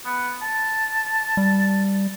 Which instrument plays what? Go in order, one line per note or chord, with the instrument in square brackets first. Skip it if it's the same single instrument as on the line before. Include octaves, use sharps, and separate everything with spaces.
[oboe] B3
A5
[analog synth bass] G3